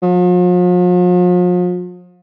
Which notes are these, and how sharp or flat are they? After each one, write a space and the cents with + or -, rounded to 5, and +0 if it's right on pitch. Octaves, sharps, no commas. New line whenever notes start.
F3 +40